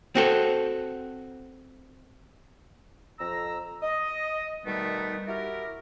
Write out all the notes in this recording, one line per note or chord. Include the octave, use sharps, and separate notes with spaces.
C4 F#4 A4
F2 A#5 E6
D#5
B2 D#3 G3 A3 B3 D#4
E4 F#4 G4 A#4